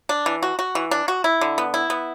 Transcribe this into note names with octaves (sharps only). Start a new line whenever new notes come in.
D4
E3
F#4
F#4
E3
D4
F#4
E4
D3
B3
E4
B3